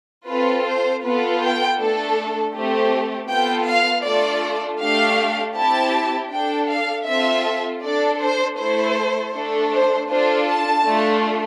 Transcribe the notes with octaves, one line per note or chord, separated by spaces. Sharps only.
C4 F4 A4 B4
C5
B3 F4 A4 B4
G5
A3 D4 A4
A3 C4 G4
B3 F4 A4 G5
F5
A3 D4 F4 A4 D5
A3 D4 G4 F5
C4 E4 G4 A5
D4 A4 G5
F5
C4 F4 A4 E5
D4 A4 D5
C5
A3 E4 A4 C5
A3 D4 A4
C5
D4 F4 A4 C5
A5
A3 D4 F4 A4